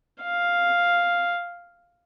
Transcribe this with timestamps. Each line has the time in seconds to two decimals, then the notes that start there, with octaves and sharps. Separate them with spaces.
0.23 F5